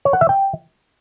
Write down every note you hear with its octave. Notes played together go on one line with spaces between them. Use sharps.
C#5
F#5
E5
G5